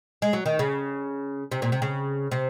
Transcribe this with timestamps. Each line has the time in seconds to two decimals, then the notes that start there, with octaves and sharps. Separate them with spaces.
0.22 G#3
0.33 F#3
0.46 D#3
0.59 C#3
1.52 C3
1.62 A#2
1.72 C3
1.82 C#3
2.32 C3